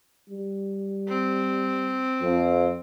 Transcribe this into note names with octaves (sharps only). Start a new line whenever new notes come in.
G3
C4
F2